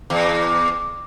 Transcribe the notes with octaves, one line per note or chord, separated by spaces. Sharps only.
E2